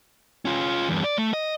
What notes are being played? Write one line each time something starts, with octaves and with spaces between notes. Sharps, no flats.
C#4 F4
E2 G2
D5
A3
D#5